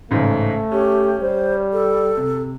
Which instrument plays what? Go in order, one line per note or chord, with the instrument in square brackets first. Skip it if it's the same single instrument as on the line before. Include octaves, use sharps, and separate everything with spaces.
[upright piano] A1 G#2 C#3 [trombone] A3
[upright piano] C#4 [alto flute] G4
[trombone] G3 [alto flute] C5
[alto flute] A4
[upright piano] C3